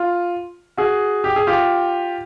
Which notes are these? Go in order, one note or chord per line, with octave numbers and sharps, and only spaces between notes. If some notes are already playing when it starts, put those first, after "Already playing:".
Already playing: F4
F#4 G#4
G4
G#4
F4 G4